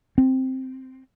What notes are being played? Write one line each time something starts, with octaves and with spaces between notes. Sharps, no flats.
C4